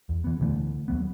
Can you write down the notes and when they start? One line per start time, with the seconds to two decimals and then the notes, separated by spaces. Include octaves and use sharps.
0.09 E2
0.24 E3 B3
0.40 D2 D3 E3 A3
0.88 D#2 F#3 B3